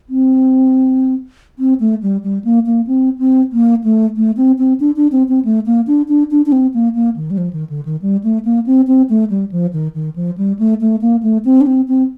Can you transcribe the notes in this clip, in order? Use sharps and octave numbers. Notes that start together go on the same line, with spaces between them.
C4
C4
A3
G3
G3
A#3
A#3
C4
C4
A#3
A3
A3
C4
C4
D4
D4
C4
C4
A3
A#3
D4
D4
D4
D4
C4
A#3
A#3
D#3
G3
F3
D#3
D3
D#3
G3
A3
A#3
C4
C4
A3
G3
F3
D#3
D#3
F3
G3
A3
A3
A#3
A3
C4
D4
C4
C4